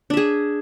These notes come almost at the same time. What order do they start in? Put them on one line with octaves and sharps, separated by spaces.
D4 E5 G#4